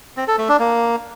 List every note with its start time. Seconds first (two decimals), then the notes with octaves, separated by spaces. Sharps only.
0.17 C4
0.28 A4
0.38 A3
0.49 D4
0.59 A#3